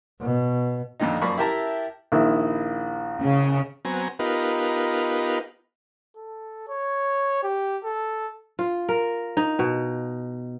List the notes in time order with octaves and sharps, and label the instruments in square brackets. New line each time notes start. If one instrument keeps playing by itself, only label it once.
[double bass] B2
[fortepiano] F2 A#2 D3 D#3 D#4
F#2 F3 A#3 D5 B5 C#6
E4 G4 A#4 E5 A5 A#5
A#1 D#3 E4
[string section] C#3
[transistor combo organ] F#3 B3 C4 G#5 A#5
B3 D#4 F4 G4 A#4 B4
[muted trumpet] A4
C#5
G4
A4
[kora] F4
A#4
D#4
B2